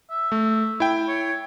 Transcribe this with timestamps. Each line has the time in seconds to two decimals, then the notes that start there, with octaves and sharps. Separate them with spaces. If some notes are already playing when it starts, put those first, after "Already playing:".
0.10 E5
0.32 A3
0.80 E4 G5
1.08 C#5